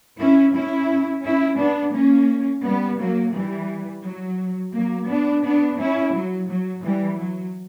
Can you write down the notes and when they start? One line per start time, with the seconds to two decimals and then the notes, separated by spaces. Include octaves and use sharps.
0.20 C#4 E4
0.55 C#4 E4
1.25 C#4 E4
1.59 B3 D4
1.94 A#3 C#4
2.64 G3 B3
2.99 F#3 A#3
3.34 E3 G3
4.05 F#3
4.74 F#3 A#3
5.09 B3 D4
5.44 B3 D4
5.79 C#4 E4
6.14 F#3
6.49 F#3
6.83 E3 G3
7.19 F#3